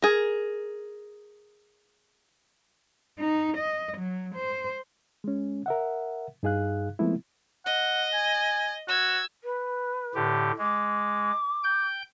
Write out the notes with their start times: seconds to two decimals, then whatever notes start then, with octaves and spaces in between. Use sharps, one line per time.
0.02 G#4 A#4
3.19 D#4
3.57 D#5
3.98 F#3
4.35 C5
5.24 G#3 C#4
5.66 A#4 E5 F#5
6.43 G2 D#4 G#4 F5 F#6
6.99 F3 G#3 A3 B3 C4 E4
7.66 D#5 F#5
8.14 G#5
8.88 F#4 E6 G#6
9.44 B4
10.15 A2 D3 G4
10.58 G#3 D6
11.63 G5 G6